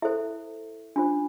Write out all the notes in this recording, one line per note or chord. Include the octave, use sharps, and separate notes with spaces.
E4 A4 C5 E5
D4 F4 C5